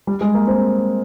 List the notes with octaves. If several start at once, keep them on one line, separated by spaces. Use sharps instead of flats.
G3
G#3
A#3
C4